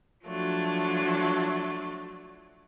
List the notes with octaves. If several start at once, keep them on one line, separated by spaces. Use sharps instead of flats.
F3 F#3 A3 D4